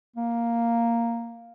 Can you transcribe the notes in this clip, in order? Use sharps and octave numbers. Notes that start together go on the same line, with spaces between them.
A#3